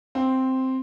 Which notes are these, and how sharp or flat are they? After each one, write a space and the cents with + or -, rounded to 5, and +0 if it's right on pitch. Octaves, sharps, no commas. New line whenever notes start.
C4 +0 F5 +0